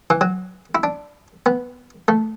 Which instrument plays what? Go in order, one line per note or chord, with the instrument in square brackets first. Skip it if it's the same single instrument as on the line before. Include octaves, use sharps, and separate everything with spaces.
[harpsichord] E3
F#3
E4
D4
B3
A3